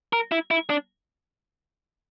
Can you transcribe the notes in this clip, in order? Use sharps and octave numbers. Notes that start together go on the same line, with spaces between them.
A#4
E4
E4
D4